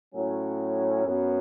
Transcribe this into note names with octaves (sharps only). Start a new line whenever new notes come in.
A2 F#3 C#4
F#2 F#3 B3